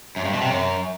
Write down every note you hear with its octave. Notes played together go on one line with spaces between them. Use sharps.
F#2
G2
B2
C3
F#2